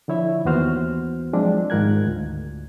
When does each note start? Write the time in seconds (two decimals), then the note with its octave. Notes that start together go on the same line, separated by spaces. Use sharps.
0.08 D3 F3 E4 C#5 E5
0.45 D#2 E3 B3 F#4 C5 F6
1.33 F3 F#3 G#3 C4 D4
1.70 G#2 D#3 F4 A#4 F#6 G#6
2.07 D2